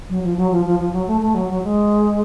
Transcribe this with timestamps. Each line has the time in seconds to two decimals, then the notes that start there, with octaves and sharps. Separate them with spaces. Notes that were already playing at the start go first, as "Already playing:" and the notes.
0.09 F#3
0.24 F3
0.37 F#3
0.52 F3
0.65 F3
0.79 F3
0.93 F#3
1.07 A3
1.21 A3
1.35 F#3
1.49 F#3
1.63 G#3